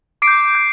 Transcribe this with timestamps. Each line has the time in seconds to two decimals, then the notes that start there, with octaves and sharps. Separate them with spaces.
0.22 D6 C7 D7
0.28 G6
0.55 G6